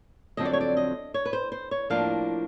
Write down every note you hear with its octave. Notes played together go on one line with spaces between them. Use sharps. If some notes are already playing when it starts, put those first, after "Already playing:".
F2 D3 F#3 C4 D#5
D5
C#5
D5
D#5
C#5
B4
C5
C5
C#5
A2 F3 A#3 D4 F5